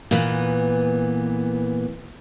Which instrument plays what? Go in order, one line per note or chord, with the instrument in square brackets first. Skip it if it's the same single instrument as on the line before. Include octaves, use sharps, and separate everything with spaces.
[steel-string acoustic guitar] A#2 E3 B3